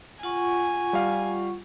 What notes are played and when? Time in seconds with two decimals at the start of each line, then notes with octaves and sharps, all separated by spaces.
0.23 F4 F#5 G#5 C#6
0.93 G3 F5